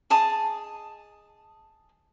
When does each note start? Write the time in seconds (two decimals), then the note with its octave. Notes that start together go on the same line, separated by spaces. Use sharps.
0.10 G#4 D#5 A5 D#6